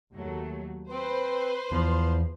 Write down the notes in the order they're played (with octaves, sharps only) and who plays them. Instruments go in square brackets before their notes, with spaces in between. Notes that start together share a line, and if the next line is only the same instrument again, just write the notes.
[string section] D#2 F#3 A3
[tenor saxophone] C4 [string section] B4 C5 C6
[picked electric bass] E2 E3 [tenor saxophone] F3